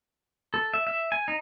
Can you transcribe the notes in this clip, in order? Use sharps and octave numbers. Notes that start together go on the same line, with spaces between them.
A4
E5
E5
G#5
D#4